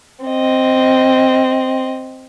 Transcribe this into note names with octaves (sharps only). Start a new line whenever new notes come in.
C4 D#5